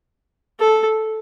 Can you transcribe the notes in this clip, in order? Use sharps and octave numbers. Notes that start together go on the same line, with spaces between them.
A4